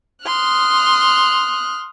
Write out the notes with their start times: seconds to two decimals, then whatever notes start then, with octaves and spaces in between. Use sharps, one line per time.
0.26 C6 D#6 F6 F#6